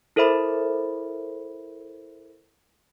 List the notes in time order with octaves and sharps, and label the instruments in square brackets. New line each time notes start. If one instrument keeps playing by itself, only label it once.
[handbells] E4 A4 A#4 C5 E5 B5